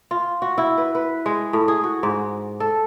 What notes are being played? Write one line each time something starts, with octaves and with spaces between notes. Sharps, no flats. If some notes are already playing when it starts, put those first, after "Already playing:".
F4
F#4
E4
B4
B4
G#3
A2
G#4
F#4
G#2
A4